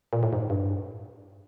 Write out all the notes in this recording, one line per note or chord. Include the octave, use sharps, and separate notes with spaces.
A#2
A2
G#2
G2